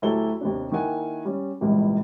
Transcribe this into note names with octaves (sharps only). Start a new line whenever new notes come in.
D2 F#3 E4 G4 A4 G7
D#2 C3 D4
D#3 A#3 E4 F#5 G#5
G3 C#4
G#1 C#2 G2 A#2 E3